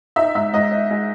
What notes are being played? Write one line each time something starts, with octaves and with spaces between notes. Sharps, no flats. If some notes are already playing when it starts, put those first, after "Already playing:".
D#4 E5
G#2 E5
G#2 D#5
D#4
G#3